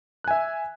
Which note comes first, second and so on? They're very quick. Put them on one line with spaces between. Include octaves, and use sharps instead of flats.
F#6 G#5 E5